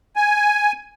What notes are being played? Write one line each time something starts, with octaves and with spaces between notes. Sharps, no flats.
G#5